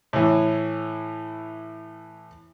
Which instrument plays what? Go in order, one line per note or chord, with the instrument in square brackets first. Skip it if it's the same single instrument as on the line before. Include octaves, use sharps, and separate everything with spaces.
[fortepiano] A2 E3